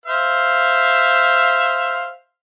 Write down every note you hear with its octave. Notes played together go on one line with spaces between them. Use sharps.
C5 E5 F5